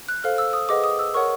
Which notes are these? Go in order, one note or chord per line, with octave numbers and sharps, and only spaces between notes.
F#6
A4 C5 F5 F6
E6
D#6
G#4 B4 D#5 F#5 D6
D#6
E6
A#4 C#5 F#5 C#6